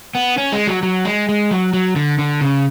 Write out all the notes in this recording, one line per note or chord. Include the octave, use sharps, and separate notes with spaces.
B3
C#4
G#3
F#3
F#3
G#3
G#3
F#3
F#3
D3
D3
C#3